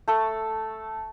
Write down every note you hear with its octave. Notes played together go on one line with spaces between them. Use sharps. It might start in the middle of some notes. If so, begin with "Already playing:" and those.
A3 A4